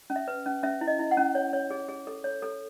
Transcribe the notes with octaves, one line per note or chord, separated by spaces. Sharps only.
C#4
E5
B4
C#4
C#4 E5
E4
D#5
E4
F#5
C#4
C#5
C#5
G#4
G#4
A4
C#5
A4